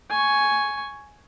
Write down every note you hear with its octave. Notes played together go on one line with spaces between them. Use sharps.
G#5 C#6